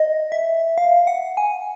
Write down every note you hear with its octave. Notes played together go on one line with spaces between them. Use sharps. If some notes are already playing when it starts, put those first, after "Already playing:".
Already playing: D#5
E5
F5
F#5
G#5